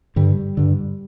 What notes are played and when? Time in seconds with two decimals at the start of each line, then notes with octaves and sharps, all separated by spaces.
0.16 G2 D3 G3
0.57 G2 D3